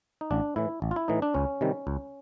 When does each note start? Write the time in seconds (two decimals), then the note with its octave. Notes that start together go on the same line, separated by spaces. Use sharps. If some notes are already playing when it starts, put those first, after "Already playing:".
0.21 D#4
0.31 A1 D4
0.56 A2 E3 E4
0.82 A1
0.91 F4
0.96 E4
1.08 A2 E3 D#4
1.22 D4
1.34 C#2 C#4
1.61 C3 D#3 G3
1.87 C#2